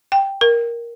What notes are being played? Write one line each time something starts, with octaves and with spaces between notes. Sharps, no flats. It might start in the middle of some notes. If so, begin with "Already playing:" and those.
G5
A#4